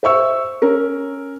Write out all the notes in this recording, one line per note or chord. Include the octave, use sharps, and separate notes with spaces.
C5 E5 C#6 E6
C#4 A#4